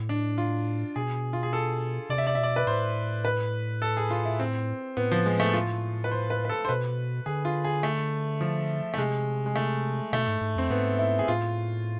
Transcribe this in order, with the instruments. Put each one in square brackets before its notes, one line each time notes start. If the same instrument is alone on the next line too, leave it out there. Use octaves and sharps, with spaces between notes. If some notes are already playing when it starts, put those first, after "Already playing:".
Already playing: [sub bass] A2
[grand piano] D4
F4
[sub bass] B2 [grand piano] G#4
[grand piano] F4
G#4
A4
[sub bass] C3 [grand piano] D5
[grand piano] E5
D5
[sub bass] B2 [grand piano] E5
[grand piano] D5
B4
[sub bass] A2 [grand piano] C5
[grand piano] B4
A4
G#4
F4
E4
C4
[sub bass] A2 [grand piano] B3
[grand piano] F3
G#3
A3
F4
B4
C5
B4
B4
A4
C5
[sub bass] B2 [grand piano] B4
[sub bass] D3 [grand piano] G#4
[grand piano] F4
G#4
A3
F3
A3
[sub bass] C3 [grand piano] G#3
[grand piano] G#3
A3
[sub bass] B2 [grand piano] A3
[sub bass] G#2
G#2
[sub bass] F2 [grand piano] C4
[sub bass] G#2 [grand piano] B3
[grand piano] E4
G#4
[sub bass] A2 [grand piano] F4